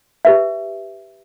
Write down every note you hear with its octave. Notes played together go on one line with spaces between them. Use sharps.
G4 B4 E5